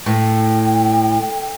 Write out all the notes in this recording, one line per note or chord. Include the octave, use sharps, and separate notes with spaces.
A2 G5